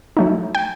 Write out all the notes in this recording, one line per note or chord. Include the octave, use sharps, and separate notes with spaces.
F#3 A3 D#4
G5